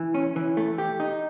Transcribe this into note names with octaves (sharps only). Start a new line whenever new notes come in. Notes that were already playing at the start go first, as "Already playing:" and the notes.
Already playing: E3
C#4
E3
A3
G4
D#4